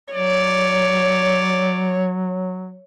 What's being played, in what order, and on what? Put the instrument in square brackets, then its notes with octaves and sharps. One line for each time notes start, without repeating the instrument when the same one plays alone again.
[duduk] F#3 [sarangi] C#5 [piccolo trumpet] D5